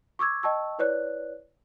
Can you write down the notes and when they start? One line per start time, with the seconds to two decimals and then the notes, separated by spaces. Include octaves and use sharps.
0.19 C#6 D6 E6 G#6
0.43 D#5 G5 A5 C#6 E6
0.79 E4 B4 C#5 D5 F#6